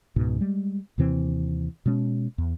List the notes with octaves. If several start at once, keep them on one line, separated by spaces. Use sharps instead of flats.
C#2 G#2 B2
G3 G#3
D#2 C3 E3 C4
B2 G#3 C4 C#4
E2